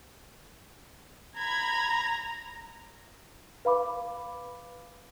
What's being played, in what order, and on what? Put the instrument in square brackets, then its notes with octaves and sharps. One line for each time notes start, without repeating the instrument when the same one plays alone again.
[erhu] A#5 [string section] B5 G#6
[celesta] B4 F5 B5 D6